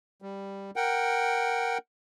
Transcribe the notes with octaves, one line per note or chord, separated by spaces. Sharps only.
G3
A#4 F#5 G5